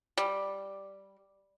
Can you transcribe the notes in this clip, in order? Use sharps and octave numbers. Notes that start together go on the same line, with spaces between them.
G3